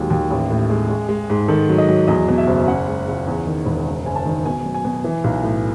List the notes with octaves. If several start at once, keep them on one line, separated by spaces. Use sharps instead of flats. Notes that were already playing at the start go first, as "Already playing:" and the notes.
Already playing: D#2 F#3 G#3 G#4
D#2
A1
A2
G#3
G#3
G#3
G#2
D#3 A4
F#3
D#5
F#3
E2 D#5
B2
E5
F#1
C#3 F#5
G#3
C#2
E2
D#3
E1
F#1
F#1 G#5
A5
D#3
B2 G#5
F#3
G#5
B2
E3
B1
A2